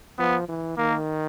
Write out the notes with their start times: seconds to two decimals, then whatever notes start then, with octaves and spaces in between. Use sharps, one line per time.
0.18 F3 B3
0.48 E3
0.77 D#3 A#3